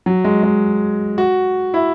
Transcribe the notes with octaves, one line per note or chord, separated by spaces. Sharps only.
F#3
G#3
G#3
F#4
E4